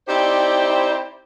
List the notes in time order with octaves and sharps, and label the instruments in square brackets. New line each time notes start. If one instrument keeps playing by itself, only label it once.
[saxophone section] C4 D#4 E4 G4 C5 D5